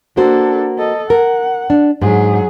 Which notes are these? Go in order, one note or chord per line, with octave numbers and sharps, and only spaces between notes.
A#3 D4 F#4 A4 C5
A4 D#5
A#4 F#5
D4
G#2 F#3 G#4